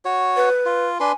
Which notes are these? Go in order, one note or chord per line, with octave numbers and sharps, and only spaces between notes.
F#4 C#5
B4
F4
D4 B4 G#5 C6